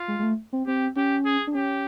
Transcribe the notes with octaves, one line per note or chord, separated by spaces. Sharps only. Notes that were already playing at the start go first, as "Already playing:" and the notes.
Already playing: F4
G#3
G#3
A3
C4
C4 G4
C#4 G4
G#4
D4
C#4 G4